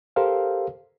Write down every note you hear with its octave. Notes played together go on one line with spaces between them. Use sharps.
G4 A4 A#4 C5 F5